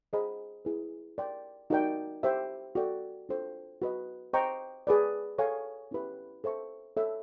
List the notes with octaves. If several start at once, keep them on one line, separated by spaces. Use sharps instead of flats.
G#4 C5 D#5 F#5 B5
E4 G#4 B4
A#4 D5 G5 C6
D#4 F#4 A#4 D5 G5
G4 C5 E5 G5
F#4 A4 D5 G5
D4 F4 A4 C5
F#4 B4 D#5
C5 D#5 G5 A#5 C#6
G#4 B4 D5
A4 C#5 F5 G#5 C#6
C#4 E4 G4 B4 E5
A4 C5 E5 A5 C#6
A4 C#5 E5